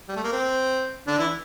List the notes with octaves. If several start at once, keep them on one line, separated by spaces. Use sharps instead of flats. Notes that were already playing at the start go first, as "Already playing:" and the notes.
G3
A3
A#3
C4
D3 D4
E3 E4